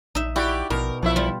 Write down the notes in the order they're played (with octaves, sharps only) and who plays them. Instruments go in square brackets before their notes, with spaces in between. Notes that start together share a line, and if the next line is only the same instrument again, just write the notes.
[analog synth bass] A#1 [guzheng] D#4 E5
[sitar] E4 G4 D5 [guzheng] F#4
[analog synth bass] A#1 [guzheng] B2 [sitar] A#4
[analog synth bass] B1 [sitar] F3 E4 E5
[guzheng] G3 F4